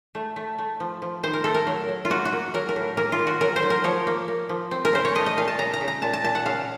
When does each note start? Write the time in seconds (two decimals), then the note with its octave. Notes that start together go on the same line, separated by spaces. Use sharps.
0.15 A3
0.36 A3
0.58 A3
0.80 F3
1.02 F3
1.23 D#3 C5
1.33 A#4
1.44 A3 A4
1.54 A#4
1.67 F#3
1.89 F#3
2.05 F4
2.10 A#3 F#4
2.25 F#4
2.32 A#3
2.54 F#3 A#4
2.69 A#4
2.76 A2
2.97 A#3 A#4
3.12 F4
3.19 D#3
3.27 F#4
3.41 F#3 A#4
3.56 C5
3.63 F#3
3.70 A#4
3.84 F3 C#5
4.07 A#3
4.28 A#3
4.49 F3
4.71 C4
4.85 A#4
4.93 C#3 C5
5.05 C#5
5.15 A3 D#5
5.26 D#5
5.37 A#2 F5
5.48 A5
5.58 C#3 A#5
5.74 A#5
5.81 C#3
5.88 A#5
6.02 A#2 A5
6.13 A5
6.24 A#2 A5
6.35 F#5
6.46 C#3 F5